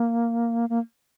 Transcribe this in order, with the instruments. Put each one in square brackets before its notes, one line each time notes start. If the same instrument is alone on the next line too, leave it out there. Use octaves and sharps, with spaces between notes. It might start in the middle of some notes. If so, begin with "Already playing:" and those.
Already playing: [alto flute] A#3
A#3